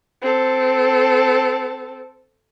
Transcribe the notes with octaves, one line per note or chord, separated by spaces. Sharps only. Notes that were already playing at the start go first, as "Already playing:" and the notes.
C4 A4